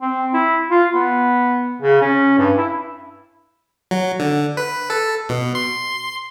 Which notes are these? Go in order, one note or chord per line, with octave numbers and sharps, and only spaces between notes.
C4
E4
F4
B3
C#3
C#4
G2
E4
F#3
D3
B4
A4
B2
C6